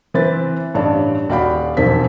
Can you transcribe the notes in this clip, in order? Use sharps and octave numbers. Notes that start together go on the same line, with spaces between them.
E3 C4 B4 A6
A1 G2 C#5 D5 A5
D#1 F#4 D5 F5 G5 B5
E1 B1 F2 C4 B6